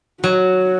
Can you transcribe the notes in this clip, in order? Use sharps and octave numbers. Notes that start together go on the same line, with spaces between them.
F#3 F#4